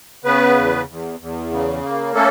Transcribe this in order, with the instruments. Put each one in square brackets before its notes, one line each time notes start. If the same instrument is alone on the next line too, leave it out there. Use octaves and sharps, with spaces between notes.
[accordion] C#3 B3 B4
E2
E2
E2
C#3
A#3
A3 C#4 A4